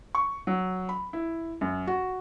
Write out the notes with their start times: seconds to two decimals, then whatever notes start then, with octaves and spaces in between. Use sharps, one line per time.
0.15 C#6
0.47 F#3
0.89 B5
1.13 E4
1.61 F#2
1.87 F#4